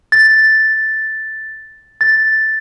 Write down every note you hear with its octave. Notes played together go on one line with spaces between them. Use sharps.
A6
A6